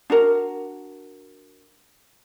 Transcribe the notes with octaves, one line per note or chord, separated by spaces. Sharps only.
D4 F#4 A#4